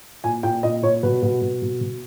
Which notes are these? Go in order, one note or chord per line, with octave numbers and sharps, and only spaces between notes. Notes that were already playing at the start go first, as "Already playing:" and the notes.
A#2 G#5
A#2 G5
A#2 D#5
A#2 C#5
B2 B4
B2
B2
B2
B2